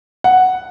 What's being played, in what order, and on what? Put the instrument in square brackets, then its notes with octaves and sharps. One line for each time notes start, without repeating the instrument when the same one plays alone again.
[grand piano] F#5